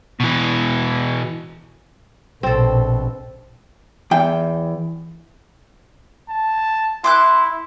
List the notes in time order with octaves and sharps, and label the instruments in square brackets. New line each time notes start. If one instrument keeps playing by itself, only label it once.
[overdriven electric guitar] B2 E3
[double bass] A#1 B2 [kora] C4 A4
[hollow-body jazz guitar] E2 G5
[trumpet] A5
[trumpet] E4 [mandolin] C6 D6 F#6